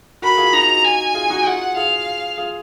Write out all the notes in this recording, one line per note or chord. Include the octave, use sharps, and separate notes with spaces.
F#4 A#4 B5
F4 G#4
D#4 F#4 A#5
G#5
F4 G#4
D#4 F#4
F4 G#4 F#5
F4 G#4 F5
F4 G#4